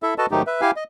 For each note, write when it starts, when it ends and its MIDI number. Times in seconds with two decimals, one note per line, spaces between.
0.03 0.14 64
0.03 0.14 69
0.03 0.14 76
0.18 0.26 66
0.18 0.26 69
0.18 0.26 71
0.18 0.26 75
0.18 0.26 81
0.31 0.42 44
0.31 0.42 51
0.31 0.42 54
0.31 0.42 57
0.31 0.42 63
0.31 0.42 67
0.47 0.61 71
0.47 0.61 76
0.61 0.71 64
0.61 0.71 67
0.61 0.71 77
0.61 0.71 80
0.76 0.84 75